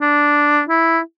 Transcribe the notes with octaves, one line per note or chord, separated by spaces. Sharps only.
D4
E4